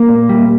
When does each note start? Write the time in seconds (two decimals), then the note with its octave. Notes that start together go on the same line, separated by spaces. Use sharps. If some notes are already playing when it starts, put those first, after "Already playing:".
Already playing: A#3
0.09 A#2
0.29 G3